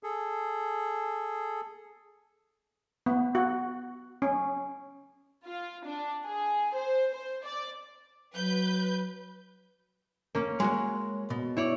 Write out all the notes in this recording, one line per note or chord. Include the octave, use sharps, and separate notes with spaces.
G#4 A4
B3
F#4
C#4
F4
D4
G#4
C5
C5
D5
F#3 B4 G6
A#3 C#4
G#3 F#4 C#5
B2
E4 C#5 D5